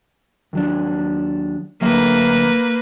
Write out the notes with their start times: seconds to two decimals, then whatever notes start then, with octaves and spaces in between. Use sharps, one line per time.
0.53 D#2 F#3 D4
1.81 D2 F#3 A#3 B4 E5